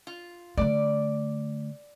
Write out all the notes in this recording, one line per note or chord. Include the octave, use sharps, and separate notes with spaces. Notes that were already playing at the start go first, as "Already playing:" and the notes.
F4
D3 A3 D5